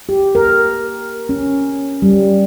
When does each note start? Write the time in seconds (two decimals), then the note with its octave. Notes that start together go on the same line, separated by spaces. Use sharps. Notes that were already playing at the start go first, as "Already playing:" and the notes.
0.09 G4
0.35 A#4
1.29 C#4
2.02 G3